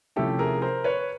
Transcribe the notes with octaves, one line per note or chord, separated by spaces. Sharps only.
C3 F3 A3 C#4 E4 G4 A4
G#4 A#4
A#4 C5
B4 C#5